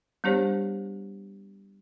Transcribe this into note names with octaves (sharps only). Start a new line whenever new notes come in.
G3 B3 D4 G4 C5 C#5